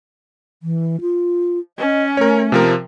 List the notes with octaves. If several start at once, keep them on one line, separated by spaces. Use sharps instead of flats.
E3
F4
C#4 D#5
A3 A#4 C#5
C3 F3 A#4